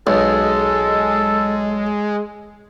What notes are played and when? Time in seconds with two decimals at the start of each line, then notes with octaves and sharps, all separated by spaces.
0.07 B1 G#3 A4